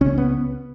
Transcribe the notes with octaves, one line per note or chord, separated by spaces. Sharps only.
C#2 C#3 C#4
B3